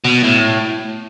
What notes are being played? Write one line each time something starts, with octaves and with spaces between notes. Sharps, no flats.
B2
A2